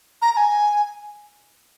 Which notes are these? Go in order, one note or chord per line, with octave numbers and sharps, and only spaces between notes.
A#5
A#5
G#5